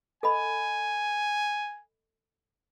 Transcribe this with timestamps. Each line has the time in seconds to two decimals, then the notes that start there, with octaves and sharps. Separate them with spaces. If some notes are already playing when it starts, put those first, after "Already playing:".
0.23 A4 D#5 G#5 B5